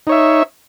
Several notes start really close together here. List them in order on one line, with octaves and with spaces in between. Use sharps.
D#4 C#5 E5